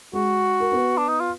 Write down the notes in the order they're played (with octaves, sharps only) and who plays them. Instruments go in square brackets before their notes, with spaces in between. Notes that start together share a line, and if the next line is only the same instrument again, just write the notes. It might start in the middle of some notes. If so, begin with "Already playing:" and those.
[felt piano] G#3 G#4 [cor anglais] F#4
[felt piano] A#4
B3 B4
[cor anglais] D4
D#4
F4